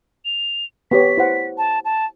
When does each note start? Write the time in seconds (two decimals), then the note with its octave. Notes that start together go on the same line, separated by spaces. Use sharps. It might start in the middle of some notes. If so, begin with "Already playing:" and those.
0.25 F7
0.91 B3 G4 C#5 B6
1.18 E4 C5 F#5
1.58 A5
1.85 A5